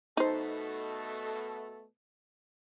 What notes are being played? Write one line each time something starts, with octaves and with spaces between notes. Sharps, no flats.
B2 A3 D#4 A4 C5